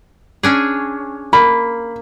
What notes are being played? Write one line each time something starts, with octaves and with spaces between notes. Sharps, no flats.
C#4 D4 G#4
A#3 B5